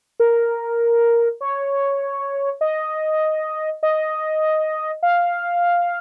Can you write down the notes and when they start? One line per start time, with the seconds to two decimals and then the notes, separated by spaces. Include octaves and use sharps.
0.20 A#4
1.41 C#5
2.61 D#5
3.83 D#5
5.03 F5